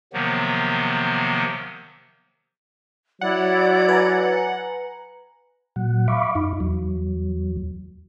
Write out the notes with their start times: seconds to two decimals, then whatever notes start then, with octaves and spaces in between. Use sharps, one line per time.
0.13 C3 D#3 F3 F#3 A#3 B3
3.21 F#3 E4 C#5 D5 F#5
3.88 B4 G#5 A#5
5.76 A#2 F#3 F#5
6.08 E5 F5 B5 C#6 D6
6.35 F#2 D#4
6.60 E2 F#3